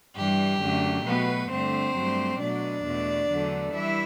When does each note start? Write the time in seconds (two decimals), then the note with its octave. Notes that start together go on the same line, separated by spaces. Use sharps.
0.17 G2 E3 G3 G4
0.61 F#2 D3 A3
1.06 B2 F#3 A3 B3 B4
1.51 G2 D3 A3 C4 C5
1.96 G2 F#3 A3
2.40 B2 F#3 A3 D4 D5
2.85 E2 B2 A3
3.31 E2 D3 F#3 A3
3.74 E3 G3 E4 E5